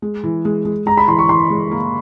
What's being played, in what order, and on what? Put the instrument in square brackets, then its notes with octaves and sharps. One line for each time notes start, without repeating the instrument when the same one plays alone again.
[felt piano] G#3
E3
G#3
G#3
[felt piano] G#3 [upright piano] A#5
[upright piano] B5
[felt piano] E3 [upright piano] C6
[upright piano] C#6
[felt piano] E3 [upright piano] C6
[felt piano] G#3
A#3